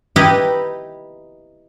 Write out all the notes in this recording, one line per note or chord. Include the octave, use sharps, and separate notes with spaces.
D#4 E4 G4 B4 D#5